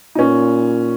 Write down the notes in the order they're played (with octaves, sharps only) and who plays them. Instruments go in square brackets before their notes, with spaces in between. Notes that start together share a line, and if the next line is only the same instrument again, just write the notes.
[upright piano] D#4
[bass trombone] A#2 [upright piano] C#4